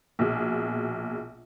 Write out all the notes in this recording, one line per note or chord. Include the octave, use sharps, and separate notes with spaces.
A#1 B2 G#4